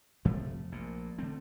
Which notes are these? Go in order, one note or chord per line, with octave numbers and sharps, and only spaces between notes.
F1 F2 C3 F3 A3
A#1 A#2
D3 A3 C4